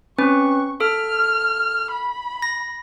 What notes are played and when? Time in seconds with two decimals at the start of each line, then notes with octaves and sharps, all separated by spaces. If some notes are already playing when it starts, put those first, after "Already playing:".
0.18 C4 C#4 B4 C#6
0.80 A4 F6
1.91 B5
2.42 A#6